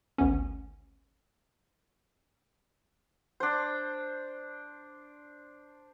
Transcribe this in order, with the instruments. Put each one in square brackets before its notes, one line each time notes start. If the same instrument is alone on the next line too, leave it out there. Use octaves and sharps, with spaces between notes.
[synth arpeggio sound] G#1 D2 B3 C#4
[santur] D4 C5